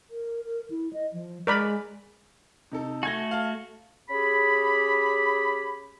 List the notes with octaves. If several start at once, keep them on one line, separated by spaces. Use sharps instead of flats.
A#4
A#4
E4
D#5
F3
G#3 A#4 D5 B5
C3 D#4 A4
A3 F#4 G#5 G#6 A#6
F5 A5
C#4 G4 G#4 B5